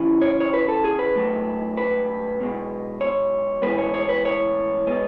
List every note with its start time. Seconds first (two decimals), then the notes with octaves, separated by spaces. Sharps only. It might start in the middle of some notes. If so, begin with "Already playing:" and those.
Already playing: E2 C#3 E3
0.22 C#5
0.40 C#5
0.54 B4
0.68 A4
0.84 G#4
0.99 B4
1.15 G#2 F#3 A3
1.77 B4
2.39 B1 B2 G#3
3.01 C#5
3.62 A2 E3 G#3 B3 B4
3.78 C#5
3.94 C#5
4.09 B4
4.25 C#5
4.86 B2 G#3 B3